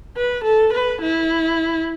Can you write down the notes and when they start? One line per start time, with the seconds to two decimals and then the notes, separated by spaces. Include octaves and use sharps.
0.17 B4
0.44 A4
0.73 B4
1.02 E4